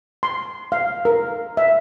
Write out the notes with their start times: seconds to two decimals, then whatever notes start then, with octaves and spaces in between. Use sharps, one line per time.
0.23 C6
0.72 F5
1.05 A#4
1.57 E5